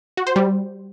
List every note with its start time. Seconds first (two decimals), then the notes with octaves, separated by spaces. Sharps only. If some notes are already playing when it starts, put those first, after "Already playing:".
0.17 F#4
0.27 C5
0.36 G3